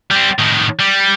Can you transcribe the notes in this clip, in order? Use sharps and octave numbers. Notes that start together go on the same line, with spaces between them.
G3 C4
A2 D#3
G3